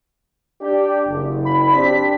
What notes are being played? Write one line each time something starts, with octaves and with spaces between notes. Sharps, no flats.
D4 G4 D5
F#1
B5
C4 D4 G4 B6